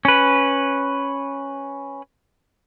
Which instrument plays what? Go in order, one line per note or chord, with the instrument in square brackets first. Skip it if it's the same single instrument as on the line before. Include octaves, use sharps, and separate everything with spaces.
[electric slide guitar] C#4 B4